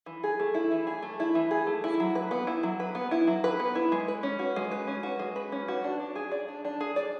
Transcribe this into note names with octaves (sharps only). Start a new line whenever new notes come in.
E3
G#4
A3
E4
E3
G#4
A3
E4
E3
G#4
A3
E4
F#3
B4
B3
E4
F#3
B4
B3
E4
F#3
B4
B3
E4
G#3
B4
C#4
F#4
G#3
B4
C#4
F#4
G#3
B4
C#4
F#4
D4
D4
G#4
D5
D4
D4
G#4
D5